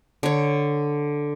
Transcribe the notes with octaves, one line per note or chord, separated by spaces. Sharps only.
D3 C#5